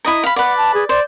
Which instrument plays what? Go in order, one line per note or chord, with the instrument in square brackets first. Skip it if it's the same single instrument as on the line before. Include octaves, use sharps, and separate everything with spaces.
[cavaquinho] E4 D#5 A#5
F5 B5
[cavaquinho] B4 D5 [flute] F#5
[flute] A5
G#4
[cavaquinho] C5 [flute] D5